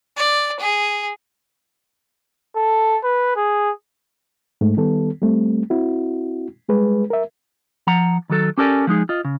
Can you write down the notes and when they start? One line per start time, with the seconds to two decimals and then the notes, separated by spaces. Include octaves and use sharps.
0.17 D5
0.60 G#4
2.56 A4
3.04 B4
3.36 G#4
4.61 G#2 A3
4.77 D#3 G3 B3 A4
5.22 G3 A3 C4
5.70 C4 E4 F#4
6.69 G3 G#3 G#4 B4
7.10 A#4 E5
7.87 F3 F#5 A#5
8.30 D#3 F#3 A4
8.58 C#4 G4 A4 A#4 D5 G#5
8.87 F3 G#3 D#4 G#4
9.09 F4 D#5
9.25 C#3